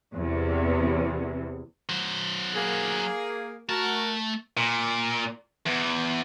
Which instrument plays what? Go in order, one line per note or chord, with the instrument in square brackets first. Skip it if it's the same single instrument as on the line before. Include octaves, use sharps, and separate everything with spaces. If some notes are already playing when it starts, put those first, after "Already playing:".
[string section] E2 C3
[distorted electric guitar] F#3 C5
[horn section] A#3 G#4
[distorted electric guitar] A3 A5 [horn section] F#4 A#4
[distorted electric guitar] A#2
E2